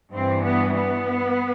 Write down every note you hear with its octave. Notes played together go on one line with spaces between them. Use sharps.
G2 E3 C4
B3
B3